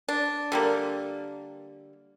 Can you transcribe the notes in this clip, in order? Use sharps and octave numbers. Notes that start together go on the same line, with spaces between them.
D4
D3 G3 A#3